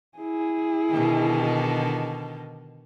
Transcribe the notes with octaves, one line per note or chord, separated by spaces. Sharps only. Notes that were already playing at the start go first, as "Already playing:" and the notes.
E4 G#4
B2 D3 D#3